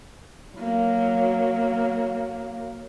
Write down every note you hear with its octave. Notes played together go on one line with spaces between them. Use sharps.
F#3 A#3